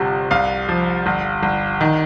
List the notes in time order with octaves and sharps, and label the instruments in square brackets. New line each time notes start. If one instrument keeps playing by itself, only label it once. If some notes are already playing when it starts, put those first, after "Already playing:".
Already playing: [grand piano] G1 C3 F3
C2 F5
F3
G1
G1
D#3